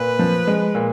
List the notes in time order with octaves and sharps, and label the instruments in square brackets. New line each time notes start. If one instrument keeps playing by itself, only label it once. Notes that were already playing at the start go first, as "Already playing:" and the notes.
Already playing: [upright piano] A#2 [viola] B4
[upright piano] F3
G#3
A#2